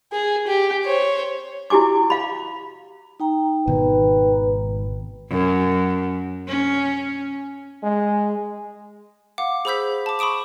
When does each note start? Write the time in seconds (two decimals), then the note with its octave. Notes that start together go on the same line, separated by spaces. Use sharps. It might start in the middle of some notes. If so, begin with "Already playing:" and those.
0.13 G#4
0.47 G4
0.85 C5 C#5
1.70 E4 F#4 G4 G#5 D6
2.10 F5 B5
3.20 D#4 G5 A#5
3.67 G#1 B2 D#3 B4
5.30 F#2
6.48 C#4
7.83 G#3
9.38 F5 F#5 D6
9.65 G#4 C5 B5 E6 G6 B6
10.06 A5 D6
10.19 B5 C#6 D#6 D7 E7